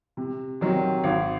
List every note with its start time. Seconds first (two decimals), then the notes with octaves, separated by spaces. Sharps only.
0.17 C3
0.61 D#3 F#3 C4
1.04 G#1